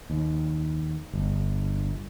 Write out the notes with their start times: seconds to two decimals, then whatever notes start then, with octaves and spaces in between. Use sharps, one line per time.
0.10 D#2
1.14 G1